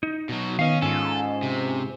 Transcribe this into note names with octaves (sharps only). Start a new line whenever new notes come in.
D#4
B2 F#3
D#3 B3 C#4 D#5 F5
G#2 C#4 F4 A4 G#5
C3